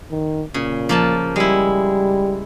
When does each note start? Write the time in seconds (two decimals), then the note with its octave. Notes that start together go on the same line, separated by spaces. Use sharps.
0.11 D#3
0.54 A#2 C#3
0.89 F3 A#3 A5
1.36 G3 G#3 E4